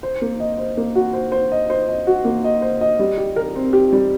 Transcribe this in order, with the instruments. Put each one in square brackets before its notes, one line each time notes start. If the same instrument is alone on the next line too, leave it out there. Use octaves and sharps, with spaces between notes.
[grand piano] C5
A#3
D#5
C5
A#3
F#4
C5
C5
D#5
C5
D#5
F#4
A#3
D#5
C5
D#5
G3
G4
A#4
C4
G4
G3